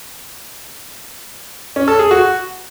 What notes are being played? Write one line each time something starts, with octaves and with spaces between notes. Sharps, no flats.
C#4
A4
G#4
F#4